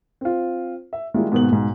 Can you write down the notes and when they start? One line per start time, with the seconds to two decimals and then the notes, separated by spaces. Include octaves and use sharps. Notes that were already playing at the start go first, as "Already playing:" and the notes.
0.21 C4 F4
0.93 E5
1.14 D#3 G3 G#3 A#3 E4 F4
1.32 G#2 B2 D#3 A#3 B3 F#7
1.52 B1 G#2